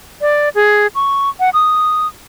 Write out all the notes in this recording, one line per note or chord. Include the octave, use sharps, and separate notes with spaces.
D5
G#4
C#6
F#5
D#6